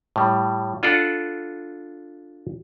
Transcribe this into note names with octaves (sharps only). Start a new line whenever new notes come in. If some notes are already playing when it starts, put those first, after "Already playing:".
A2 G3
D4 F4 A4 B4 D5 F#5